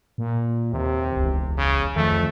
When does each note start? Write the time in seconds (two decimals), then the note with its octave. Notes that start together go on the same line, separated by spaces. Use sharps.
0.18 A#2
0.73 D#2 C3
1.17 E1 C#2
1.58 C#3
1.96 F2 D#3 A3